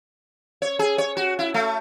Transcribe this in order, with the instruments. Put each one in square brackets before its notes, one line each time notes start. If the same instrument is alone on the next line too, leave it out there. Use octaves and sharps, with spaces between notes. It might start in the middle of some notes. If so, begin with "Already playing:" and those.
[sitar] C#5
G#4
C#5
F#4
E4
A3